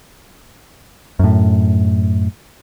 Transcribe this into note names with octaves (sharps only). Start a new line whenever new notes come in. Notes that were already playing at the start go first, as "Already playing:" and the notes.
F#2 A2